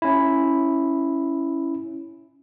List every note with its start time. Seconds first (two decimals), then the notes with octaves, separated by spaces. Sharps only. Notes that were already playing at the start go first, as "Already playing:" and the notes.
0.02 C#4 E4